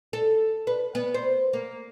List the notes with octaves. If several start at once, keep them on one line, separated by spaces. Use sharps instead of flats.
A4
B4
B3
C5
A#3